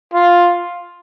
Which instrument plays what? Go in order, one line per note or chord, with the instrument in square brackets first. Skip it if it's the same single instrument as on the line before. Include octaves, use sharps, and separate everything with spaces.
[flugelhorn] F4